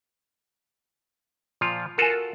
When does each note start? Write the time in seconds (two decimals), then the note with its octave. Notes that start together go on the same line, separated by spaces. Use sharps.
1.61 A#2 F3 F4
1.98 F4 F#4 A4 A#4 G#5